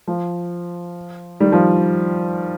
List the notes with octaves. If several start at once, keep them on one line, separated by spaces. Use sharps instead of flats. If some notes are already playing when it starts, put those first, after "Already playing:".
F3
D#3 G3
F3